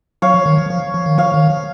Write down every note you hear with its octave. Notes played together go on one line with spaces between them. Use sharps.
F#3 C#5 F5
F3
D#3
F3
F3
F3
D#3
F3 C#5 F5
D#3
F3